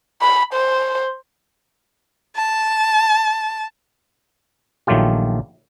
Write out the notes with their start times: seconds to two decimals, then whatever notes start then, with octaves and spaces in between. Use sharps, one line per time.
0.22 B5
0.54 C5
2.36 A5
4.87 A#1 D#3 F#3 A3 F4 G4